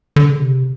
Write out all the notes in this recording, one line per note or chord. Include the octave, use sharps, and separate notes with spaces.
D3
C#3
C3